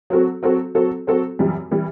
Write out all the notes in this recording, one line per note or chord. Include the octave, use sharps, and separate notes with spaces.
F#3 C4 F#4 A4
F#3 C4 F#4 A4
F#3 C4 F#4 A4
F#3 C4 F#4 A4
F#2 E3 G3
E3 G3